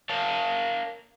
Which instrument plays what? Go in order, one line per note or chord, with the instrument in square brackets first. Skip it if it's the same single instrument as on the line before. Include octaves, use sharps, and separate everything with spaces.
[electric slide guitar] A#4 C#5 F5 A5